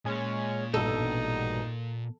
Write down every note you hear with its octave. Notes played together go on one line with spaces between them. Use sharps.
A#2 G#3 C#4 C#5
A1 G2 B2 D#4 A4